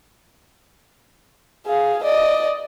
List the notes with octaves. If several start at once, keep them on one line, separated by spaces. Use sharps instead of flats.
G#4 F5
D5 D#5